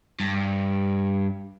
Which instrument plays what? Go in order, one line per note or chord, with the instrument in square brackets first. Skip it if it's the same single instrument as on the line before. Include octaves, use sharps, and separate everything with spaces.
[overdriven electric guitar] G2